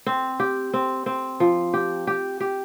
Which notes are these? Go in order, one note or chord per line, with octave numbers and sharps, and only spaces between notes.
C4
G4
C4
C4
F3
G4
G4
G4